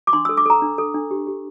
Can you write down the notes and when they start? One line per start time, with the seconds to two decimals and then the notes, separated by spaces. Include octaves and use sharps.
0.07 D6
0.13 D4 C6
0.25 A4 E6
0.37 D6
0.46 A4 A#5
0.62 D4
0.78 A4
0.94 D4
1.11 G4
1.27 G4